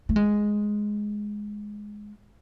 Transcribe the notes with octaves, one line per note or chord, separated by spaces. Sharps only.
A3
G#3